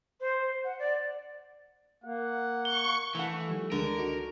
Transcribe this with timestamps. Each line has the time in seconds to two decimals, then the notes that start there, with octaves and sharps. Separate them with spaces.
0.20 C5
0.64 F#5
0.79 D5
2.04 A#3 F#5
2.65 C#6 G7
3.15 E3 A3 F#5
3.49 D#3 F3 G3
3.72 C#2 D3 G#3 A#4
3.98 D#4 F#4 C#6